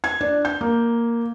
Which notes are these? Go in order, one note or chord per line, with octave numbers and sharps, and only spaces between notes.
G#6
D4
G6
A#3